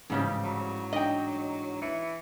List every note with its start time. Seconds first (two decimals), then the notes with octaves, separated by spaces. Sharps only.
0.10 A1 F2 G#2 C#3 G3 C#5
0.44 F#3
0.93 D4 D#4 D#5 G5
1.82 E3 C#7